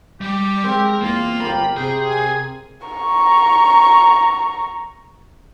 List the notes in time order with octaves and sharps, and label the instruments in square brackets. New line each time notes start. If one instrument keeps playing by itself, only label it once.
[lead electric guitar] G3 [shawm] G4
[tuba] G#3 [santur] C4 [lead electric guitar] A#4
[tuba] E2 [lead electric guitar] A#3 [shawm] F4
[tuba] G1 [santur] G4 A#4 [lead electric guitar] B5
[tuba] C3 [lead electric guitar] G#4 [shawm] G5
[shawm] G#5
[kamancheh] A#5 C#6